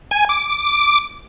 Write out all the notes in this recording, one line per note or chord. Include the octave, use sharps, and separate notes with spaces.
G#5
D6